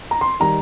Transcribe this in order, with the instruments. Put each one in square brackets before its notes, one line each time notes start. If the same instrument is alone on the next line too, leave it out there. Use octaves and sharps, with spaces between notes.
[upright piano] A#5
C6
D#3 G3 A#5